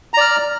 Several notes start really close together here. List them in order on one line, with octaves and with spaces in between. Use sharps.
A#5 D5 F6